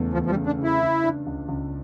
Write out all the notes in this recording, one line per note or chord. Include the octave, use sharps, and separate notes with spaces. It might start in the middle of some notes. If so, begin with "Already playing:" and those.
Already playing: E2 C#3 A3
E2 F3
F3
G3
C#3
D4
C#3
E4
C#3
D4
C#2
C#2